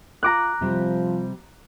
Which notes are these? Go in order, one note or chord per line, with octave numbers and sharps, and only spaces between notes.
F4 A#4 A#5 D6 F#6
C3 F3 G3 C4